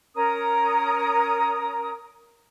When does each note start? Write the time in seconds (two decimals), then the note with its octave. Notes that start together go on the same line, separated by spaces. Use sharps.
0.16 C#4 A#4 A#5 D#6